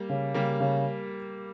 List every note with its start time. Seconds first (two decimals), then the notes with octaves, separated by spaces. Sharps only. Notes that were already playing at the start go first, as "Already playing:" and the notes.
Already playing: G3 A#3
0.09 C#3
0.34 C#3 G3 A#3
0.60 C#3